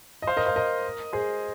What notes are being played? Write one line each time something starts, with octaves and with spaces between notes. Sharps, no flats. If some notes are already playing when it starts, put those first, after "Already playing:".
D#5
C5 F5
A#4 D#5
C5 F5
A#4 D#5
G#4 C5